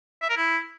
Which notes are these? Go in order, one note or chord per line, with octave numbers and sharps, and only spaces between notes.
E5
A#4
E4